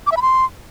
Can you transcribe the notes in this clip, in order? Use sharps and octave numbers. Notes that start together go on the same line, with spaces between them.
D6
E5
B5
C6